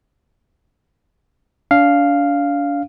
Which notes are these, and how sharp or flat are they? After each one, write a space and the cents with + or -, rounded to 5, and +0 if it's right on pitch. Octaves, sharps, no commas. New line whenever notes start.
D4 -35 F5 +0